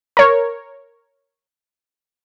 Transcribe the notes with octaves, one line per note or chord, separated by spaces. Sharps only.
A#4 C#5